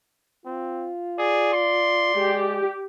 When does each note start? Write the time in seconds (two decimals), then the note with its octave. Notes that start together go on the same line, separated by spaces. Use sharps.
0.46 C4 F4
1.19 G#4 D5
1.53 C6
2.15 G#3 G4